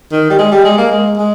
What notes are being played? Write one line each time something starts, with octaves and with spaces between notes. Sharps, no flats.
D#3
G3
G#3
G3
G#3
A#3
G#3
G#3